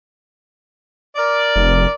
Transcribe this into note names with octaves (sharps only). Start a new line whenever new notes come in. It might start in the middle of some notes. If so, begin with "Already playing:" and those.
A#4 D5
F1